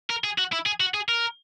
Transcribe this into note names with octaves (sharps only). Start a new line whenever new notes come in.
A#4
G#4
F#4
E4
G#4
F#4
G#4
A#4